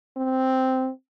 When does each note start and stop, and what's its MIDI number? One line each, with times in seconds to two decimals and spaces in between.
0.17 0.90 60